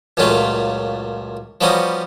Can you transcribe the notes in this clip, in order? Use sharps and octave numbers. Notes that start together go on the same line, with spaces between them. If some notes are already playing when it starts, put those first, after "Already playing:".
C#2 F#2 A#2 A3 C#4 F4
F3 G3 B3 C#4 D#4 F#4